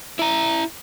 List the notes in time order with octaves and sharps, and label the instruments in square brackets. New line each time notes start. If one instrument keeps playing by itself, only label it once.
[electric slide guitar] E4 A#5